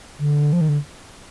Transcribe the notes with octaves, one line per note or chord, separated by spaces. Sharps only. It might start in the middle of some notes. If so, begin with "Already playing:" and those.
D3
F3
D#3
D3